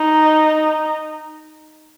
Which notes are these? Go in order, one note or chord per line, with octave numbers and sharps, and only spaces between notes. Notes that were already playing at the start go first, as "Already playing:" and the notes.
Already playing: D#4